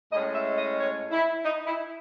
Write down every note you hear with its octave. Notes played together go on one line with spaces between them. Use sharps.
A2 G#3 C#4 D#5
E5
D#5
C#5
E4
D#4
E4